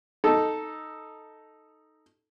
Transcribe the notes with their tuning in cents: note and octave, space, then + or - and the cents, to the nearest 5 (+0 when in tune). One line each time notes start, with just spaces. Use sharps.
D#4 +0 A4 +0